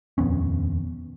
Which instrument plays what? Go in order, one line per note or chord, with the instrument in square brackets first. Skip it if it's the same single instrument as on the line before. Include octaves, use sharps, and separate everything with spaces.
[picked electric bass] D#1 F2 B3 C#4